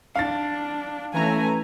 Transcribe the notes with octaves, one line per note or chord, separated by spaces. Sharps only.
D4 F5 A6
E3 A3 C#4 G#5 A#5